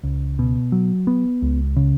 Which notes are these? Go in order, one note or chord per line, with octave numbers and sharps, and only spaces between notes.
C#2
B2
F#3
B3
C#2
C#3